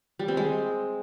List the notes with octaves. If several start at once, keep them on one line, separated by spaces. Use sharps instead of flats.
G3
C4
G#3